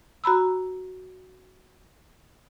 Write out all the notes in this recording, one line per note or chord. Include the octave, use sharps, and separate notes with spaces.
F#4 A#5 B5 E6